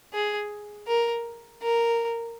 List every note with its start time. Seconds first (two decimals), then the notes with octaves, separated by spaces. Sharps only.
0.13 G#4
0.88 A#4
1.62 A#4